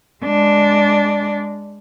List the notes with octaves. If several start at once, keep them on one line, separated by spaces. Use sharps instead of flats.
G#3 D4